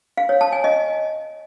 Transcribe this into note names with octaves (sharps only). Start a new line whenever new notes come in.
F5
C#5
A5
G#5
D#5